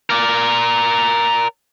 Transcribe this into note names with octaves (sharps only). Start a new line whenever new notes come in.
A#4 D5